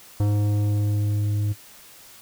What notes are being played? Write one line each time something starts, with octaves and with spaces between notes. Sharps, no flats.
G#2